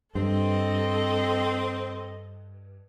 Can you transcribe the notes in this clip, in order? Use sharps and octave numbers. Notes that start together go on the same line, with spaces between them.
G2 C4 A4 D#5